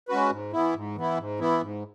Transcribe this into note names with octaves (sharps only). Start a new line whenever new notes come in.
G#3 C#4 F#4 B4
G#2
E3 B3 E4
G#2
E3 B3 E4
G#2
E3 B3 E4
G#2